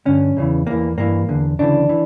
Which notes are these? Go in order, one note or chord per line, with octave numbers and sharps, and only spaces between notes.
G2 D3 C#4
E2 C#3 E3
E2 E3 A#3
G2 E3 A#3
E2 D3
D2 C#3 E3 D4
E3